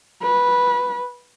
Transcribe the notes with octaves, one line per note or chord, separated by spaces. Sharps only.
B4